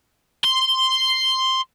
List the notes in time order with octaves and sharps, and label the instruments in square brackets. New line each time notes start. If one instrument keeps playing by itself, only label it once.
[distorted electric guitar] C6